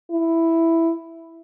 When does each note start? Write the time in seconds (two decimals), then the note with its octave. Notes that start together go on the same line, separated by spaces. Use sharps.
0.11 E4